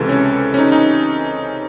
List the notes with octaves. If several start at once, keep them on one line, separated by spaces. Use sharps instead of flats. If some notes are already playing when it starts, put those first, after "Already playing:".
Already playing: C#2 C3 E3 A4
C#4
C#4
D#4
D#4